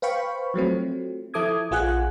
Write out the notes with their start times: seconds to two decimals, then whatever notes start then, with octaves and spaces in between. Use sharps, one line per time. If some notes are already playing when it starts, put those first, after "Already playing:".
0.02 B4 C5 F5 G5 B5 C#6
0.54 F3 F#3 A3 C4
1.34 F3 E4 A4 D6 D#6 G#6
1.71 A#1 F4 G#4 F#5 G#5 F#6